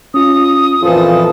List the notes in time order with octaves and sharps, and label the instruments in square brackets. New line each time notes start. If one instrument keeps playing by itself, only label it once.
[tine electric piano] C#4 F4 [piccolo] D#6
[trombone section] F2 A#2 F3 [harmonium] E3 A4 [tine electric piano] F4